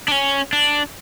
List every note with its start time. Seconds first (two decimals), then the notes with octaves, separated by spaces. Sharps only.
0.08 D4
0.12 C#4
0.53 D4